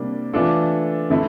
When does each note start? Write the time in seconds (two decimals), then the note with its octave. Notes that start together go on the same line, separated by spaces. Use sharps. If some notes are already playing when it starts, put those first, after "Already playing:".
Already playing: C3 G3 A#3 D4
0.33 E3 A3 D4 F4 A4
1.10 D3 A3 E4